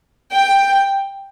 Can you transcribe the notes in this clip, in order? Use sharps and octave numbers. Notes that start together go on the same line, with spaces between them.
G5